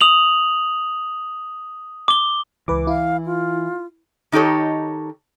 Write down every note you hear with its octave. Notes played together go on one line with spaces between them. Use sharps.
D#6 F7 F#7
D6 G7
C#2 E3 B4 D6
E4 F5
F4
D#3 D#4 G4 A4 C#5